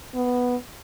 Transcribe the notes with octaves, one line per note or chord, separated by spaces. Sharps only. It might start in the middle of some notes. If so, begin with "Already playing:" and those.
B3